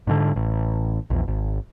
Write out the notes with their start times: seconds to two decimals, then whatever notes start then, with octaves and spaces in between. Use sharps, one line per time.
0.07 G#2 B2 D3
0.36 A1
1.10 A#1 E2
1.28 G#1